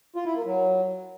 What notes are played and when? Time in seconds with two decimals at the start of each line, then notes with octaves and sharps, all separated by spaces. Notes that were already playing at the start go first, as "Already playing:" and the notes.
0.16 F4
0.26 E4
0.36 A#3
0.46 F#3